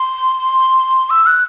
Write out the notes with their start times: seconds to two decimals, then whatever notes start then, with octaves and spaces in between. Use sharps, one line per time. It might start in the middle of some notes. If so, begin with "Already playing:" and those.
Already playing: C6
1.10 E6
1.26 F#6